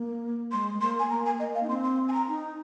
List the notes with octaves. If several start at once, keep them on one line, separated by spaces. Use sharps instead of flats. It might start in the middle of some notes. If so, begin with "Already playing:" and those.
Already playing: A#3
G#3 C6
G#3
A#3 C6
G#5
A#3 A#5
G#5
A#3 D#5
F5
D#4
C4 C6
C6
G#5
A#5
D#4